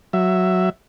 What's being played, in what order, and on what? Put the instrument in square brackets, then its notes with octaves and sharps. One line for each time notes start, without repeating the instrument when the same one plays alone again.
[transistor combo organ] F#3 E5